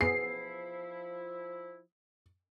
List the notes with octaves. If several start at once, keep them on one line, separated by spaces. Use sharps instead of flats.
F3 B3 E4 G#4 C7